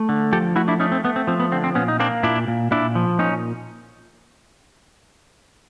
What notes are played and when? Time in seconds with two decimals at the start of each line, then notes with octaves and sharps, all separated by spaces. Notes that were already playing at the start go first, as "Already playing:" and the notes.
Already playing: A3
0.09 D3
0.33 F3 G4 A4
0.56 A3 E4 F#4
0.68 D4 E4
0.80 A3 C#4 D#4
0.92 C4
1.04 A3 B3
1.16 C4
1.27 F3 C4
1.40 B3
1.52 D3 C4
1.64 C4
1.75 A#2 B3 C#4
1.88 D#4
2.00 A#3 C4 D4
2.23 A#2 D4 E4
2.48 A#2
2.71 A#2 D4 E4
2.95 F3
3.19 A#2 C#4 D#4